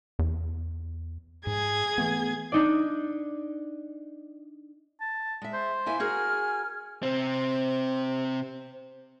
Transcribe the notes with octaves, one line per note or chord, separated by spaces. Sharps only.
E2
G#2 G#4 G#6
E3 A3 B3
D4 D#4 D5
A5
G#3 E5
C5
A#3 E4 E5 G#5
F#4 G#4 A#4 G#5 F6
C3 C4 C5